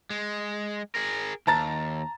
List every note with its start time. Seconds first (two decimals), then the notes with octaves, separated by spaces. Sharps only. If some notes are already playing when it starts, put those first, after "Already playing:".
0.10 G#3
0.95 G#4 A#4
1.47 D#2 A5 A#5 A6